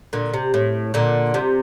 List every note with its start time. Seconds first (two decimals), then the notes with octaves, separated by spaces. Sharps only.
0.13 A#2 D3
0.34 C3
0.54 A2
0.94 A#2 D3
1.34 C3